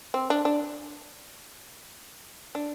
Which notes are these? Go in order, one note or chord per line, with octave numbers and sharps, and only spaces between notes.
C4
D4
D4
D4